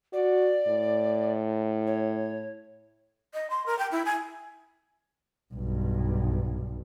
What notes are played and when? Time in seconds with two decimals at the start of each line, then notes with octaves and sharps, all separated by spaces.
0.13 F#4 D5
0.67 A2
1.87 C#5
3.34 D#5
3.50 C6
3.66 A#4
3.79 G5
3.92 E4
4.05 G#5
5.54 B1 G2